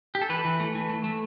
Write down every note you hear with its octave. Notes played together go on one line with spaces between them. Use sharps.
G4
A4
E3 B4
E3
A3
E3
A3
A3